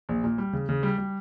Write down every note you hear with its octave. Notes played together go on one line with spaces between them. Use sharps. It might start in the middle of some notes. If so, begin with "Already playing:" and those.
A#1
A#2
G3
C#3
C#3
G3
G3